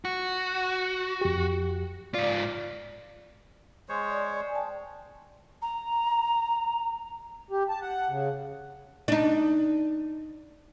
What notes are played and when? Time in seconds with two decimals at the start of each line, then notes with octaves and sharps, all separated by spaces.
0.05 F#4
1.21 F2 G4
2.14 G#2 F4 D5
3.89 G#3 C5 C#5
4.10 D5 C6
4.43 D5 G#5
4.55 G5 A5
5.62 A#5
7.51 G4
7.69 A5
7.82 F#5
8.09 C#3
9.08 D4 D#4